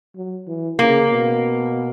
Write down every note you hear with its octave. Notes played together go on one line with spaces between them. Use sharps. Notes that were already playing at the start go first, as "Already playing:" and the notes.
F#3
E3
C#3 A#3
B2